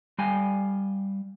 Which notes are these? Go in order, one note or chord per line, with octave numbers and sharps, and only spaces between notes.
G3 F5 G5 G#5